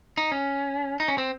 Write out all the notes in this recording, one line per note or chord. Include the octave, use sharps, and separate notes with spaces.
D#4
C#4
D#4
C#4
C4